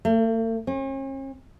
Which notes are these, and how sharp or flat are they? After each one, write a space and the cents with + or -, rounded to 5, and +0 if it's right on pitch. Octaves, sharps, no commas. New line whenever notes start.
A3 +45
C#4 -45